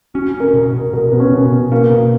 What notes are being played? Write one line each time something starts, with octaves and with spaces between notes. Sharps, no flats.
C#4 F#4
C#4
A#4
B2
B2
B2 A#4
B2 B3
C#4
B2
B3
B2
A#3 C#4
B2